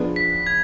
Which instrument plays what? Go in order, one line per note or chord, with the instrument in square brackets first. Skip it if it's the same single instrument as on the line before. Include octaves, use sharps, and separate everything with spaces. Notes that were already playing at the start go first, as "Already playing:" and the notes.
Already playing: [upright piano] F3 B3 D4 G#4
[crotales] B6
G#6